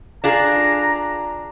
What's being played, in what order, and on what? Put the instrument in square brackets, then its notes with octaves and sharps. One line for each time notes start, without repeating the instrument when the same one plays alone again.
[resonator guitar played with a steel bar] D4 F4 G#4 [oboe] A#5